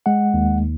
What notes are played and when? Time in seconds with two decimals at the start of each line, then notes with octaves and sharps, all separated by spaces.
0.06 G#3 F#5
0.34 D#2